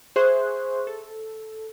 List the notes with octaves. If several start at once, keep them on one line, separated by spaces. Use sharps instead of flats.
G#4 C5 E5 C6 C#6 F#6
A4